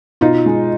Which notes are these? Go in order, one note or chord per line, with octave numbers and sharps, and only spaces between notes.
B2 D#4 F4
G#3